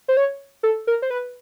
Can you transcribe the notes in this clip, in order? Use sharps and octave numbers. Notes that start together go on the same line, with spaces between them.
C5
C#5
A4
A#4
C5
B4